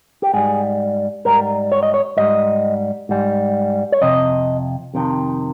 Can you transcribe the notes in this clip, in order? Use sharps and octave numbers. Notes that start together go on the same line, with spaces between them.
G4
G#2 G3 G#4
G#2 G3 A#4
C#5
D#5
C#5
G#2 G3 D#5
G#2 G3
C#5
F2 C3 D#5
F2 C3 D#3